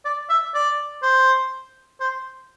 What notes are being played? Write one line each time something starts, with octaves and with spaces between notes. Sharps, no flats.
D5
E5
D5
C5
C5